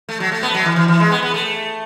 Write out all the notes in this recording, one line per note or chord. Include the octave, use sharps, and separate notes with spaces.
A3
F#3
A3
B3
F#3
E3
E3
E3
G#3
B3
B3
A3